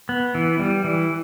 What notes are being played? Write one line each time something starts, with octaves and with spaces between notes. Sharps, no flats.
B3
E3
G3
E3